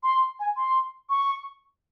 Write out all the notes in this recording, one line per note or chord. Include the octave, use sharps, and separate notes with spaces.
C6
G#5
C6
C#6